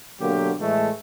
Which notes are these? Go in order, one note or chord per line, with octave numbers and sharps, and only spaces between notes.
B2 D3 F#3 A#3 G4
A2 E3 G#3 A3